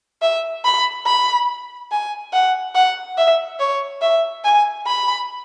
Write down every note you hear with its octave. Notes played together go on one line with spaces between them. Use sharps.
E5
B5
B5
G#5
F#5
F#5
E5
C#5
E5
G#5
B5